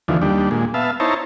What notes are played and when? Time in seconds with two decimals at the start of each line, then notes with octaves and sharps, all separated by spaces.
0.08 D#2 D3 E3 F3
0.22 D#2 G3 D4
0.51 A#2 G#3
0.74 B3 E5 F5 A5
1.00 D#4 E4 C5 C#5 A5 A#5